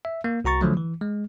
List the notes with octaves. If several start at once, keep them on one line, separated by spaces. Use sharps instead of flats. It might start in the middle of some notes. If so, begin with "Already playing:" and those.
E5
A#3
C2 F#4 A#5 C#6 A6
D3 F3 F#3 A3
E3
G#3